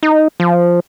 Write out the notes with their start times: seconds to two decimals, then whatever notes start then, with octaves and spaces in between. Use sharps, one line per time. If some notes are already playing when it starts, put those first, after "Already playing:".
0.03 D#4
0.40 F3